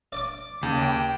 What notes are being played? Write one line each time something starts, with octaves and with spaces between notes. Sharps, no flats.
D5 D6
D#2 C#3
G5